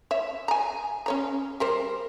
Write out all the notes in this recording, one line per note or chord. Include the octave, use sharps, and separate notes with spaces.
C#5 E5
G#5 A#5
C#4 C#5 A#5
G3 A#4 C5